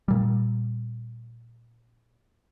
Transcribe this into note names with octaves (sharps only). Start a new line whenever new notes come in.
A#2 G3